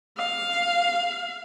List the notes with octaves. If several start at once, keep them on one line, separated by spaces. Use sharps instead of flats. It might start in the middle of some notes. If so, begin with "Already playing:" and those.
F5